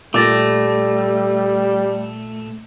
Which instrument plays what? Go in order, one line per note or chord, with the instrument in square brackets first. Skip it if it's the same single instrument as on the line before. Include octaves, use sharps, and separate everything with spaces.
[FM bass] A#2 [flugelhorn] G3 [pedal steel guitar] A3 [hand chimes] D6 A6 A#6